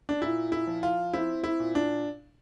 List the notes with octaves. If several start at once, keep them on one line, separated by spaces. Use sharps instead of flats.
D4
A#2 E4
E4
F3
F4
C4 E4
E4
A#2
D4